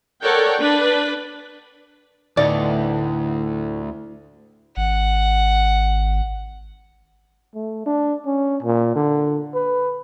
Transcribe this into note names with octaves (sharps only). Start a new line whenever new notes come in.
A4 A#4 C#5 D5 F#5 G5
D4 B4
D2 A2 B3 D#4 D5
G#1 F#5
A3
D4
C#4
A#2
D3
B4